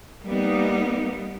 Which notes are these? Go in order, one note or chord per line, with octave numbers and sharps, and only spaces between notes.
G3 A#3 B3 D#4